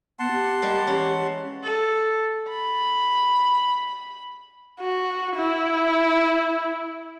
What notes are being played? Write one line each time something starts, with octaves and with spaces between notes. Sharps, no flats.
B3 F#5 A5 C6
G4
G3 G#3 A#3
E3 C#4
A4
B5
F#4
E4